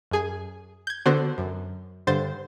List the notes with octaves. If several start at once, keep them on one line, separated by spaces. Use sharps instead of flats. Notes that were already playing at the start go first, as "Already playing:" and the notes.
F#2 G#4 G#5
G6 G#6
D3 B3 F#4 C5
F#2
G2 D3 C5 A6